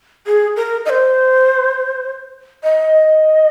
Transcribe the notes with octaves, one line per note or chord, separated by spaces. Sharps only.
G#4
A#4
D#5
C5
D#5